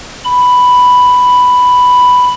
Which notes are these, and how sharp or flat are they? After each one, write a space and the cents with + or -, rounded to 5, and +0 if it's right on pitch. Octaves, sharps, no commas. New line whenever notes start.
B5 +5